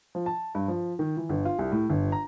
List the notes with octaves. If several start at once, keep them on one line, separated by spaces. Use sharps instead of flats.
F3
A5
G2
F3
D#3
E3
G1
F4
C2
A2
G1
A#5